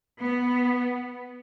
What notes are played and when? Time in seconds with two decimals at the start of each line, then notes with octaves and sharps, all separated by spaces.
0.21 B3